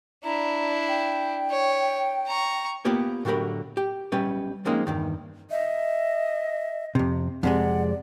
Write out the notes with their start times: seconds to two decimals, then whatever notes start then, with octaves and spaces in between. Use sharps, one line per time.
0.24 D4 E4 A#5
0.88 G5
1.51 C#5
2.27 A#5 C#6
2.85 A#3 B3 F4 G4 C#5
3.25 A2 D3 F#3 G4 A#4 B5
3.77 G4
4.12 B1 G3 C#4 B4
4.65 F3 G#3 A#3 C4 C#4 D#4
4.87 E2 G2 D#3
5.51 D#5 E5
6.95 F2 C3
7.43 F2 C3 G#3 D5 F#5